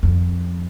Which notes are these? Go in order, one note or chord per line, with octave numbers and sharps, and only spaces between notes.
F2